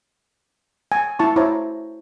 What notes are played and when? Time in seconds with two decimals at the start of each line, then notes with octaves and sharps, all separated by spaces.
0.92 G#5
1.19 E4 A5 C#6
1.36 E4 C5 C#5 A#5